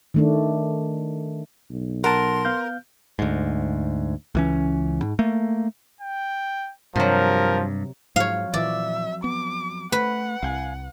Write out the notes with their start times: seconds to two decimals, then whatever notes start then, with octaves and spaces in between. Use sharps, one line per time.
0.14 D#3 A3 D4
1.70 B1
2.04 A#4 F#5 A5 C6
2.45 B3 F5 G6
3.19 D2 G#2
4.35 C#2 E3 C#4
5.02 G#2
5.19 A3 A#3
6.00 G5
6.96 G2 C3 F3 F#3 A#4
8.16 F2 G#2 F3 F#3 C#5 F5
8.54 A#2 E3 F3 D5 E5
9.24 B3 D6
9.92 A3 B4 F#5
10.43 C2 F5 G5 G#5